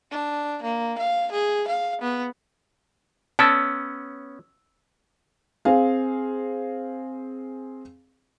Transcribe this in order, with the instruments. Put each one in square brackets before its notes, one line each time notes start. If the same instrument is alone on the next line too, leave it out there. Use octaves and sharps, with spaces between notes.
[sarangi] D4
A#3
F5
G#4
F5
B3
[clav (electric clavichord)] B3 C#4 [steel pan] A5 [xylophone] E6 D7
[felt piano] C4 G#4 F5